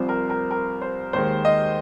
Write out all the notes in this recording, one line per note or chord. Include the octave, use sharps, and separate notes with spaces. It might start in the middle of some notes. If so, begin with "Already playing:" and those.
Already playing: C2 C3 F3 C5
A#4
A#4
A#4
C5
D#2 D#3 G#3 C5
D#5